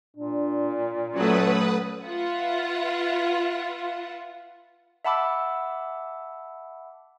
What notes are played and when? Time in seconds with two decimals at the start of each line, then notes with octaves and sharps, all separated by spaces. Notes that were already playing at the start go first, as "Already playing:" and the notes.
0.17 A#2 D4
1.14 F#3 A3 C#4 B4 F#5 D#6
2.05 F4 B4 E5 F#5
5.05 E5 F#5 A5 B5 D6 E6